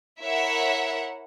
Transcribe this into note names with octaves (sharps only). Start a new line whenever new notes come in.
E4 A#4 C#5 E5 F#5